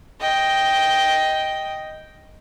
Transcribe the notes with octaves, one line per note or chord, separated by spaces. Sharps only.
D#5 G5